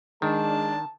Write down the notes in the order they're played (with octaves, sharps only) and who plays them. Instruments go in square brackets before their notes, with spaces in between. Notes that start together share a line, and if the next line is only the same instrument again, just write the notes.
[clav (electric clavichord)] D#3 [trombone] G#3 [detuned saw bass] D4 [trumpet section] A5